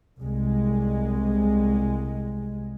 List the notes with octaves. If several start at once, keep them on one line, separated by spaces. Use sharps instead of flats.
C2 G#3